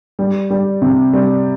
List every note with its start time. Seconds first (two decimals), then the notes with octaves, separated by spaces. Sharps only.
0.19 G3
0.50 G3
0.82 C3
1.13 G3